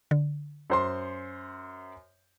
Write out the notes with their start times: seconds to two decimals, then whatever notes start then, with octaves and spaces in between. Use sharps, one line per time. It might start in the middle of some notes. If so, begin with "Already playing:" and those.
0.11 D3
0.70 F#2 C5 C6